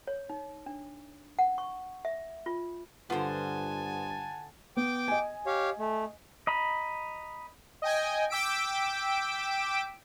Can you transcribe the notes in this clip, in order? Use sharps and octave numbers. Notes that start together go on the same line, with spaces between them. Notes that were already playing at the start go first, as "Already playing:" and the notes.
C#5
D#4
D4
F#5
C#6
E5
F4
G2 D3 B3 F4 C5 F#5 G#5 A5
B3 G5 D6
D#5 G#5
G4 C#5 F5
A3
D#5 A#5 B5
D#5 G5 G#5
G5 D6 E6 B6 D7